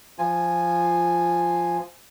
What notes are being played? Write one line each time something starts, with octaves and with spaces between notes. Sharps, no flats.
F3 F4 G#5